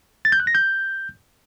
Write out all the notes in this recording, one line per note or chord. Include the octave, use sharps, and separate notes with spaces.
A6
G6
F#6
A#6
G6